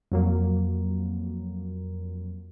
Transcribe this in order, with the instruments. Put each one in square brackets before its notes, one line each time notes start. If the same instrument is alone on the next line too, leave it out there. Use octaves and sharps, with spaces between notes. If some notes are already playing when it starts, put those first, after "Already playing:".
[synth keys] F2 F#3 A#3